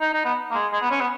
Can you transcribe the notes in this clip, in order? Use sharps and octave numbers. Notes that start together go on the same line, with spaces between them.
D#4
D#4
B3
A#3
G#3
G#3
B3
C#4
B3